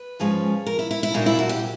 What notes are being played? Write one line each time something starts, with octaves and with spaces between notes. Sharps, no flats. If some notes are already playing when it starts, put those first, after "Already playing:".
Already playing: B4
G#2 F3 G#3 C#4
A#4
E4
E4
E4
A#2 F#3 A#3 D4 D#4
E4
F#4
G4